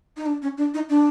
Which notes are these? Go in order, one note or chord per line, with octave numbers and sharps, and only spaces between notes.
D#4
D4
C#4
D4
D#4
D4